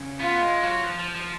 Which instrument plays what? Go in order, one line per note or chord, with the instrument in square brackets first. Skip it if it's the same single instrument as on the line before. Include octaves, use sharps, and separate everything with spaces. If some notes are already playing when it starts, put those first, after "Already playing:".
Already playing: [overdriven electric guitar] C#3
[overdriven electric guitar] B3 [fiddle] F4
[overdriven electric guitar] G#3
F#3
F3
F3
F3